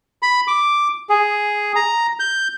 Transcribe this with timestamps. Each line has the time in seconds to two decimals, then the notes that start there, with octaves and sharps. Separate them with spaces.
0.22 B5
0.48 D6
1.09 G#4
1.76 A#5
2.20 G6